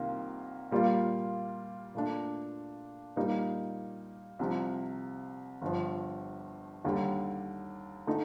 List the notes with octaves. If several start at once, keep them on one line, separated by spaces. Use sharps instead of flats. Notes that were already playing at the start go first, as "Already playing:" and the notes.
Already playing: C2 C3 D#3 A#3 F4
A#2 G3 A#3 F4
A#2 A3 D4
A#2 G3 A#3 D#4
C2 C3 F3
G1 G2 F3
D#2 D3 G3
D3 A3 D#4